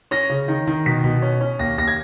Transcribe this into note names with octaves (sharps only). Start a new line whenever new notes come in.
C#4 A#6
C#3
D#3
D#3
B2 B6
B2
C#4
C#4
D#2 A#6
D#2 A#6
G#6